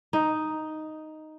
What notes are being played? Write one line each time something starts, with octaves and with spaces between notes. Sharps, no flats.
D#4